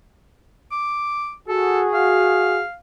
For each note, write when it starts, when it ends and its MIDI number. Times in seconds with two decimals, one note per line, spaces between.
0.72 1.33 86
1.49 2.61 66
1.49 2.61 68
1.49 1.81 69
1.94 2.75 77